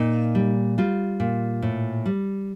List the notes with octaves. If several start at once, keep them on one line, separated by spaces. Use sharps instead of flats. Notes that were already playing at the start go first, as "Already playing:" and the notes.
Already playing: A#2 D#4
G3
G3 F4
A#2
A2
G3